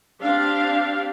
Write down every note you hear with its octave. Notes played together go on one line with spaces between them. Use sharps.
C4 D4 G4 F5